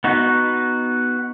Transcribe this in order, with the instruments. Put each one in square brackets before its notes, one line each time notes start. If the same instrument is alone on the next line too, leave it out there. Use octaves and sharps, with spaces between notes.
[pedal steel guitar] B3 D#4 F#4